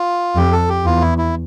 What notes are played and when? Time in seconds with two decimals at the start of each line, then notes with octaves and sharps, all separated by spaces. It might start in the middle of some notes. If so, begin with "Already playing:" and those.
Already playing: F4
0.36 F2 G4
0.52 A4
0.69 G4
0.85 E2 F4
1.01 E4
1.18 E4